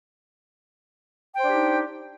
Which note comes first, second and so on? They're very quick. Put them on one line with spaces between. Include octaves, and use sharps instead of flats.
G5 C5 D4 G4 D#4